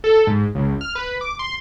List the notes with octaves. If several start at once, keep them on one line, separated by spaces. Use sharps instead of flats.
A4
G#2
C#2
F6
B4
D6
C6